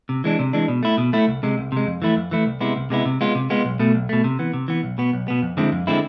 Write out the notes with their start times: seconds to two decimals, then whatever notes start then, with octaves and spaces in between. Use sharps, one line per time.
0.09 C3
0.24 E3 G#3 D4
0.39 C3
0.53 E3 G#3 D4
0.68 B2
0.83 A3 E4
0.98 B2
1.13 A3 E4
1.28 C2
1.43 C3 G#3
1.58 C2
1.72 C3 G#3
1.87 F2
2.02 E3 A3 E4
2.16 F2
2.31 E3 A3 E4
2.46 C2
2.61 C3 G#3 B3 E4
2.76 C2
2.90 C3 G#3 B3 E4
3.05 C3
3.21 G#3 B3 F4
3.35 C3
3.50 G#3 B3 F4
3.65 B1
3.79 B2 A3
3.94 B1
4.09 B2 A3
4.24 C3
4.39 E3 B3
4.53 C3
4.68 E3 B3
4.83 B1
4.98 B2 B3
5.13 B1
5.28 B2 B3
5.42 F2
5.57 D3 G#3 C4 E4
5.72 F2
5.87 D3 G#3 C4 E4